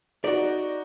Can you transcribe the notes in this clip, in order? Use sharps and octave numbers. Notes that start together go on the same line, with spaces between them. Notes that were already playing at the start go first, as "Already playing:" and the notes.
D#4 F#4 D5